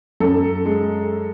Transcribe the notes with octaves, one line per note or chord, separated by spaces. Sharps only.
F#2 A4
G#3